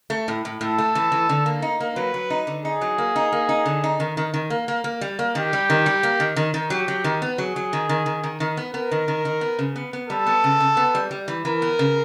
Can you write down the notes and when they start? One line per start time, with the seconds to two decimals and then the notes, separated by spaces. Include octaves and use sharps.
0.10 A3
0.28 A2
0.45 A2
0.61 A2 A4
0.78 A3
0.95 E3
1.12 E3
1.29 D3
1.46 A#3
1.62 D#4
1.80 A#3
1.96 F#3 B4
2.14 F#3
2.30 D#4
2.47 D3
2.64 D#4 G#4
2.81 F#3
2.98 A#3
3.16 D#4
3.32 A#3
3.49 D#4
3.66 D3
3.84 D#4
4.00 D#3
4.17 D#3
4.34 D#3
4.50 A#3
4.68 A#3
4.84 A#3
5.01 G3
5.19 A#3
5.35 D#3 G4
5.53 G3
5.70 D#3
5.86 G3
6.03 A#3
6.20 D#3
6.36 D#3
6.54 D#3
6.70 F#3 G4
6.88 F#3
7.04 D#3
7.22 B3
7.38 F#3 G#4
7.56 F#3
7.73 D#3
7.89 D#3
8.06 D#3
8.23 D#3
8.40 D#3
8.57 B3
8.74 B3 A#4
8.91 D#3
9.08 D#3
9.25 D#3
9.41 B3
9.59 C#3
9.76 B3
9.93 B3
10.09 G3 A4
10.26 B3
10.44 C#3
10.60 C#3
10.77 B3
10.95 G3
11.11 G3
11.28 E3
11.45 E3 A#4
11.62 B3
11.79 C#3